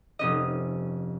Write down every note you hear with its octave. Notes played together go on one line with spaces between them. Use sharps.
F1 C#4 D#5